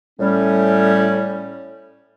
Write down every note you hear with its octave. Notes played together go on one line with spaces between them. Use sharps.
A2 G3 C#4